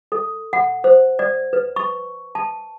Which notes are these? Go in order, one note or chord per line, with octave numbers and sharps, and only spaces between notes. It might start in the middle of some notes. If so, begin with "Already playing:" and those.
A4
F#5
C5
D5
B4
C#6
A5